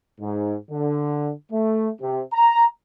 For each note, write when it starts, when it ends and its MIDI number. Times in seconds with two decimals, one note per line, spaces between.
0.20 0.55 44
0.70 1.31 50
1.52 1.89 57
2.01 2.21 48
2.33 2.64 82